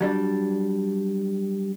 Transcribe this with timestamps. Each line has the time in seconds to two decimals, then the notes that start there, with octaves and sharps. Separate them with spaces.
0.01 F#3 G3 D4